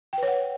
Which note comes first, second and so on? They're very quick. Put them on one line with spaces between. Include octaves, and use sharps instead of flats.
G5 B4 C#5 F#5